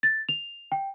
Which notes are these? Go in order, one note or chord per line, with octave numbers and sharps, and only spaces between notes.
A6
F7
G5